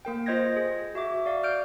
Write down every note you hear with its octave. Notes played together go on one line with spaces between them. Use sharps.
A#3 A#4 G5
F4 C5 D#5 G6 G#6 A#6
G#4
F#4 E5 D6
F#4 D5 F5
F6 G6 D7